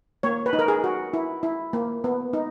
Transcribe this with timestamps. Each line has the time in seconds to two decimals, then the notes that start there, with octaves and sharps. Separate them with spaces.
0.23 A#3 C#5
0.46 B4
0.53 D#4
0.59 A#4
0.68 G#4
0.84 F#4
1.14 E4
1.43 E4
1.73 A#3
2.04 B3
2.33 D#4